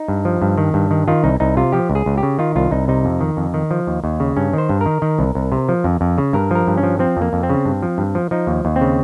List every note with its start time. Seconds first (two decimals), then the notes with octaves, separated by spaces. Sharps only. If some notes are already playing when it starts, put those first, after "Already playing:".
Already playing: D#4
0.08 G2
0.25 F3
0.42 G2
0.58 D#3
0.74 G2
0.91 D#3
1.08 D#3 F4
1.24 C2 D#4
1.40 C2 D#4
1.57 C3 F4
1.72 F3 G4
1.90 C#2
1.95 G#4
2.06 C#2
2.18 G4
2.23 C#3
2.39 D#3 F4
2.56 C2 F4
2.71 C2 D#4
2.88 C3 D#4
3.05 F2
3.21 D#3
3.37 F2
3.54 D#3
3.71 F3
3.87 D#2
4.04 D#2
4.20 C#3
4.37 G2 C#4
4.53 D#3 C5
4.69 G2
4.81 D#3 A#4
5.02 D#3
5.19 C2
5.35 C2
5.52 C3
5.69 F3
5.84 F2
6.01 F2
6.18 C#3
6.33 G2 A#4
6.51 F3 A#4
6.67 G2
6.78 C#4
6.83 F3
6.99 F3 C4
7.17 F2
7.22 A#3
7.33 F2
7.43 C4
7.50 C#3
7.66 G2
7.83 F3
7.98 G2
8.15 F3
8.31 F3 D#4
8.47 D#2
8.65 D#2
8.76 C4
8.81 C#3